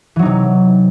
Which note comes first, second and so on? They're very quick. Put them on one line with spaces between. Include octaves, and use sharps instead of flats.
E3 F#3 D#4 C3